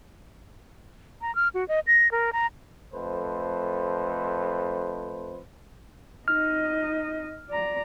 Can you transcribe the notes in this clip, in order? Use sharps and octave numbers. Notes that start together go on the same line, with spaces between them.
A#5
F6
F#4
D#5
A#6
A#4
A#5
F2 A3 B4 C5
D#4 D#5 F6
D5 A#5